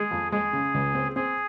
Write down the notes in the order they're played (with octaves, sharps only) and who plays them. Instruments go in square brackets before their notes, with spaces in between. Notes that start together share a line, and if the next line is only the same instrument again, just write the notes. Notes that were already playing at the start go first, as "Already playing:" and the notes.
Already playing: [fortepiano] G#3 [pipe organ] G#4
[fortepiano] F2
[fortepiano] G#3 [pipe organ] G#4
[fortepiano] C#3
C#2
C4
[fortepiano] C4 [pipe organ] G#4